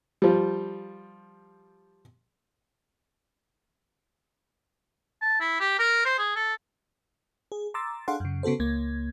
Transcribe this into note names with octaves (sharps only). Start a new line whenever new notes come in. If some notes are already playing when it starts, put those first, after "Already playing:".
F3 G3
A5
E4
G4
A#4
C5
G#4
A4
G#4
A#5 C6 D6 E6 A6
D4 G#4 A4 F5 F#5 C6
F#2 C#3
C#3 B3 F#4 A4 C5
C#2 A#3 G#6